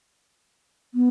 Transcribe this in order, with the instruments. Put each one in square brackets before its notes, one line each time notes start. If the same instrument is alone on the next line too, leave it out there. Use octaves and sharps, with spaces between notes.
[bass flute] B3